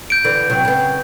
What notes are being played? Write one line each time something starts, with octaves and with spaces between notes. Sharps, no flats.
G6 D7
D3 E3
C3 F#3
C#3 B3